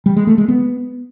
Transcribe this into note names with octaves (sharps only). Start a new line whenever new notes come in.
G3
G#3
A3
G#3
B3